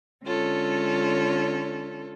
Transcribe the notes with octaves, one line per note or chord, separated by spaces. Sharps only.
D3 G#3 C#4 F4 A4 C#5